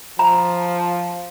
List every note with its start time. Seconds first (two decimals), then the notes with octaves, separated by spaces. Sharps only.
0.19 F3 A#5